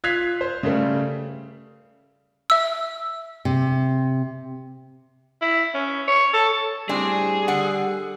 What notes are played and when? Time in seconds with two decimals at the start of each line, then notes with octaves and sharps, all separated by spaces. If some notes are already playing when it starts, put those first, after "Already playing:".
0.04 F4 F#6 G#6 B6 C7 F7
0.41 C5
0.63 C#3 G3 A3
2.50 E5 E6
3.45 C3
5.42 E4
5.74 C#4
6.08 C#5
6.34 A4
6.89 A2 G3 C4 D4 G#4
7.48 D3 F#5